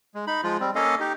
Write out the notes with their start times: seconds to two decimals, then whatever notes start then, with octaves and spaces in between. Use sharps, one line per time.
0.15 G#3
0.27 D#4 B5
0.43 F3 G#3 F4
0.60 G3 C4
0.75 A#3 C#4 A4 D#5 F5
1.00 D#4 G4